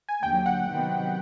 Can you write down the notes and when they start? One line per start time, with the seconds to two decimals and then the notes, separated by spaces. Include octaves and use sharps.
0.09 G#5
0.23 D#2 D3 F#3 G5
0.46 F#5
0.68 C3 D#3 F#3 B3